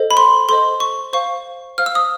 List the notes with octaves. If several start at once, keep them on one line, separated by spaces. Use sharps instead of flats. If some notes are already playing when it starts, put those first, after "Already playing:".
Already playing: A4 C5 D#5
B5
C6
A4 C5 D#5 C6
C#6
C5 F5 C#6
C5 F5 F6
E6
D#6